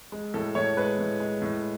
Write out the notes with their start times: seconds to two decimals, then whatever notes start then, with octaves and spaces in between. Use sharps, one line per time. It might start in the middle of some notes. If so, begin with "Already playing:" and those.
0.12 G#3
0.34 A2 A4
0.55 A2 C#5
0.77 G#3 B4
0.98 A2
1.20 G#3
1.42 A2